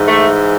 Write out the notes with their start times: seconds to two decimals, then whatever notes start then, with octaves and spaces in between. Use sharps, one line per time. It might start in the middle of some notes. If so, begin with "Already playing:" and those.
Already playing: G#2 E3
0.08 A3